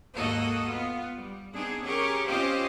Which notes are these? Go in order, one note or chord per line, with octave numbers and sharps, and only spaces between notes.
D#2 G#2 A#3 F#4 A4 D#5
B3 F4
G3
B3 C4 D4 D#4 G#4
C#4 G4 G#4 A#4 C#5
C4 C#4 F4 G4 C5 D#5